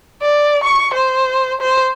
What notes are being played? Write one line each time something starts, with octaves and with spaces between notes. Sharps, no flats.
D5
C#6
C5
C5